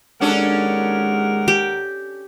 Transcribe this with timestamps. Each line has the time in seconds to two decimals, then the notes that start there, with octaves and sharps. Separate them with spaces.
0.21 D#2 G#3 C#4 D4 A4 A#4 F#5
1.48 G4